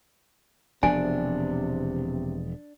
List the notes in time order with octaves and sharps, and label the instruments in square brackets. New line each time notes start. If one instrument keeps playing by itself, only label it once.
[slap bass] E1 F3 B3 [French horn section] C3 [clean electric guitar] D4 [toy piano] G#5